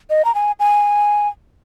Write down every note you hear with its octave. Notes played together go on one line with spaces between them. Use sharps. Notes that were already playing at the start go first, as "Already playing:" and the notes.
D#5
A#5
G#5
G#5